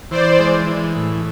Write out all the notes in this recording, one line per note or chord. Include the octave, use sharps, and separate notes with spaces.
E3 C5 D5
G#3
E3
A2